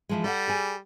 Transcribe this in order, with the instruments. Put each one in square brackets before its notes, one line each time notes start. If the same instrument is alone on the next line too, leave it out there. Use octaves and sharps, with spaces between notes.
[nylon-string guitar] E3 F3 G#3
[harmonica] G3 [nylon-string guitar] A4 E5 F#5
[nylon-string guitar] G#4 G#5